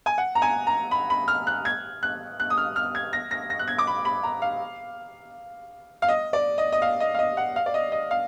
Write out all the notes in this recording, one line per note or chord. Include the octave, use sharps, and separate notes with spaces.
G#5
F#5
A#5
G#5
A#5
B5
B5
F6
F#6
G#6
F#6
F#6
D#6
F6
F6
G#6
A#6
A#6
A#6
F#6
G#6
D6
B5
B5
A#5
F5
F5
D#5
D5
D#5
D#5
F5
D#5
F5
D#5
F#5
F5
D5
D#5
D#5
F5